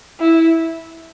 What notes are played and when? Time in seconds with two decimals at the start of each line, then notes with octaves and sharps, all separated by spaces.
0.20 E4